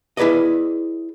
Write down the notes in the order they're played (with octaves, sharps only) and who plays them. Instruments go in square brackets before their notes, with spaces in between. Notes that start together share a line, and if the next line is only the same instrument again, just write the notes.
[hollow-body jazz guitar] E4 G#4 B4 D5 D#5